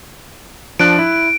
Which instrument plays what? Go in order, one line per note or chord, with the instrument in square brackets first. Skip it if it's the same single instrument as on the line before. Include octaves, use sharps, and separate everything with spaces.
[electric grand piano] F3 D4 F#6 [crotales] D7
[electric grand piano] E4